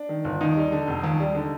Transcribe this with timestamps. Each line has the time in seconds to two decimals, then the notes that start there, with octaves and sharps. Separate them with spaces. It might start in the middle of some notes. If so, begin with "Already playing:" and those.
Already playing: D4
0.09 D#3
0.24 G1
0.41 D#2 D#4
0.56 G3
0.72 D3
0.87 F1
1.04 D#2
1.20 G3
1.35 D3